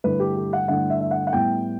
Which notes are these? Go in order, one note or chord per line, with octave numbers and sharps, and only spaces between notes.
G2 D3 A3 E4 B4
G4
G4
F#5
G2 D3 A3 E4 F#5
E5
E5
F#5
F#5
A2 G3 B3 E4 G5